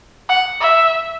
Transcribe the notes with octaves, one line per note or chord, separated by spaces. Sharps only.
F#5
E5